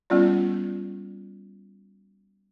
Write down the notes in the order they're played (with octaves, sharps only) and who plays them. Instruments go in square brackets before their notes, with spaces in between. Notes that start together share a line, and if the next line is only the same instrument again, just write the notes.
[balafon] G3 B3 C#4 F4 D5